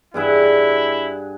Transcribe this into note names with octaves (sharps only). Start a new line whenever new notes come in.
G2 E4 G#4 F#5